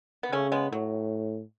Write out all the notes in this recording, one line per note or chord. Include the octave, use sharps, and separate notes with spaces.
B3
C#3 A3 C#4
G#3 B3
A2 F#3